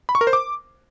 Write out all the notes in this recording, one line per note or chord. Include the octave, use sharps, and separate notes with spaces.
B5
C#6
A#4
C5
D6